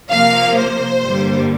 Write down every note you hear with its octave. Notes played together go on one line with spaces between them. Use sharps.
C3 F3 A#3 F5
C5
G2 D3 G3 A#3